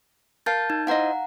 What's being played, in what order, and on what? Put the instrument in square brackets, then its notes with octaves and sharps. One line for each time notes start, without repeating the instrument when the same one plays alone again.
[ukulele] A#4 F5 [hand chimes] A5 G6 A6
[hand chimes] D#4
[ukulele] E4 C5 D#5 [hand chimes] F5 F#5 A#5